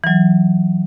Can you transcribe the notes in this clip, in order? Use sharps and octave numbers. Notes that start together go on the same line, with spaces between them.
E3 F#3